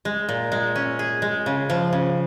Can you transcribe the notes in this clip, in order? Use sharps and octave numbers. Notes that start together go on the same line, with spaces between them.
G#3
A#2
G#3
C#4
G#4
G#3
C#3
F3
C#3